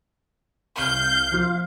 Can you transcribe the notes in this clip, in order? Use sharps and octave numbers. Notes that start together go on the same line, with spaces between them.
C2 F5 G6
F3 F4